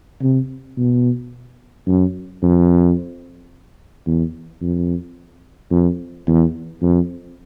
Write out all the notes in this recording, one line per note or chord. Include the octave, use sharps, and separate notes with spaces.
C3
B2
F#2
F2
E2
F2
F2
E2
F2